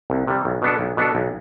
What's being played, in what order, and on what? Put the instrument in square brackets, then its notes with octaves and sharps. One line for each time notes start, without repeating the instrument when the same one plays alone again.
[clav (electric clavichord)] C2
C3 G3
B1
B2 B3 D4 A4
B1
B2 B3 D4 A4
B1